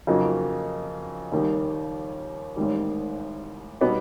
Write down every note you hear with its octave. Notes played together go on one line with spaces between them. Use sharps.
F2 C#3 F#3 A#3 D#4
D#2 D#3 G3
A1 G#2 D#3 G3
B2 G3 B3 D#4